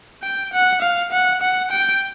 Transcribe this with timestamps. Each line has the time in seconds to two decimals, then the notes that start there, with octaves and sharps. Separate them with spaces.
0.23 G5
0.53 F#5
0.82 F5
1.12 F#5
1.41 F#5
1.71 G5